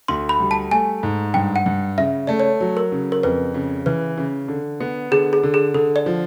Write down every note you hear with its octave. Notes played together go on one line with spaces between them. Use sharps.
D2 C6
B5
G3
A5
A3 G#5
G#2
G2 G5
F#5
G2
C#3 E5
A3 D5
C#5
F#3
A#4
C#3
A#4
F2 B4
C#3
E3 B4
C#3
D3
B3
D3 G#4
G#4
D3
G#4
D3 A4
D5
F3